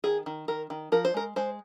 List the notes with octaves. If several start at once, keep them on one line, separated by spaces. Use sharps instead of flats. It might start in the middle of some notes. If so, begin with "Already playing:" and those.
D#3 G#4
D#3
D#3 A#4
D#3
F3 A#4
C5
G#3 A#4
G#3 C5